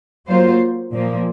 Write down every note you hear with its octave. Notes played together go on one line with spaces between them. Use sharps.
F#3 A#3 F4 C5
A#2 F3 A#3